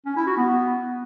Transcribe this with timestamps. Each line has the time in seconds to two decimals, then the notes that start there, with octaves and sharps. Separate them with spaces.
0.06 C#4
0.16 E4
0.27 F#4
0.37 B3